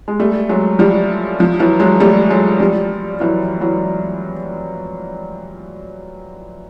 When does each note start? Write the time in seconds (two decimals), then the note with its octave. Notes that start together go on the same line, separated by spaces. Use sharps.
0.08 G#3
0.20 G3 A3
0.49 F#3 G#3
0.79 F3 G3
1.40 F3
1.59 E3 F#3
1.79 F#3 G#3
2.00 G3 A3
2.30 F#3 G#3
2.60 F3 G3
3.20 E3 F#3
3.61 E3 F#3